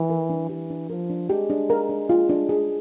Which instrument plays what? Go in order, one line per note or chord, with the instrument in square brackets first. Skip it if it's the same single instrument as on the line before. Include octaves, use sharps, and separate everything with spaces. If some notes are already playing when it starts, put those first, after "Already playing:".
Already playing: [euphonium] E3
[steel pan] A#4
D4
[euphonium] E3 [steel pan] G4
[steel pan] D4
[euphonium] F3 [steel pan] A#4
[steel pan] D4
[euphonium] G#3 [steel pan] G4
[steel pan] D4
A#4
D4
F4
D4
G#4